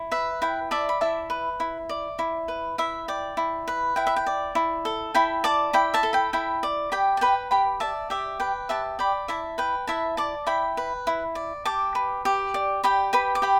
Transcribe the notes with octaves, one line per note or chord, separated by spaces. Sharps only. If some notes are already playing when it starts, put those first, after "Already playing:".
Already playing: E4
B4 E5
E4 G5
D5 E5 A5
B5
E4 E5 A5
B4
E4
D5
E4
B4
E4 E5
D5 G5
E4
B4
E4 G5
E5
G5
D5
E4
A4
E4 G5 B5
D5 A5 D6
E4 G5 B5
E5 A5
A4
G5 B5
E4 G5 B5
D5
G4 G5 B5
A5
B4 G5 B5
G4 G5 B5
D5 E5 A5
G4 E5
B4 G5
G4 E5 A5
D5 G5 B5
E4 E5 A5
B4 G5
E4 E5 A5
D5 A5 D6
E4 G5 B5
B4
E4
D5
G4 A5 D6
B4
G4
D5
G4 G5 B5
B4 G5 B5
D6
G4 G5 B5